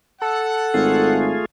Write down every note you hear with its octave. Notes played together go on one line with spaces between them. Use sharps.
A4 F#5
G#1 A3 F4 G#4